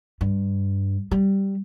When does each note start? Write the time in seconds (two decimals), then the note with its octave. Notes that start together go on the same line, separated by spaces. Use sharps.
0.21 G2
1.11 G3